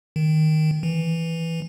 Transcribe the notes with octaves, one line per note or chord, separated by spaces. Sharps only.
D#3
E3